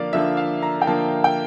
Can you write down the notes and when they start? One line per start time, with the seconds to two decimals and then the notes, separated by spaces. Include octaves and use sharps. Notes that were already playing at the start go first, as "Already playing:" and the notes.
Already playing: D3 F3 A#3 D5 F5
0.13 D3 F3 A#3 E5
0.37 F5
0.63 A#5
0.82 G5
0.87 D3 F3 A#3 A5
1.24 G5